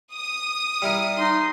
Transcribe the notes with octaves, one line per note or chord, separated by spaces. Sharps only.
D#6
G3 E4 A#4
D#4 C6